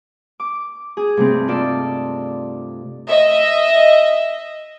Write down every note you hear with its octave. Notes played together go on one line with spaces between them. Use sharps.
D6
G#4
G2 C3 A3 C4
D#4 F4 A4 D5
D#5 E5